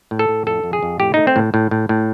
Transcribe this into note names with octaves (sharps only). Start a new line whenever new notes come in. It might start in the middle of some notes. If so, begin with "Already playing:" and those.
A2
A4
A2
F2 A4
F2
G#4
F2
A2 G4
A3 D#4
C4
A2
A2
A2
A2